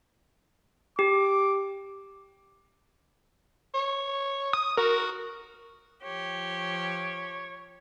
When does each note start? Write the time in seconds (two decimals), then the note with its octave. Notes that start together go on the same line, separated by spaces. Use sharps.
0.99 G4 D6
3.74 C#5
4.53 D#6
4.77 F#4 A#4
6.03 F3 G4 C#5